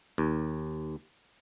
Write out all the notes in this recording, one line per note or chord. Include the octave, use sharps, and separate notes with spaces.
D#2